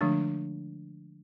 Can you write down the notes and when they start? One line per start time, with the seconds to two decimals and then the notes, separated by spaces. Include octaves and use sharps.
0.01 D3 F3 G#3 A3 D4